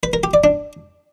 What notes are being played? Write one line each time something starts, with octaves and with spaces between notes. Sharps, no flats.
B4
A#4
G4
D5
D4